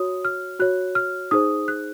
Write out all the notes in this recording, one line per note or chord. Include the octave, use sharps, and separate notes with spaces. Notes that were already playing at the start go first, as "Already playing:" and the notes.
Already playing: F#4 C#5 D#6
F6
F#4 C#5 F#6
F6
D#4 G#4 C5 D#6
F#6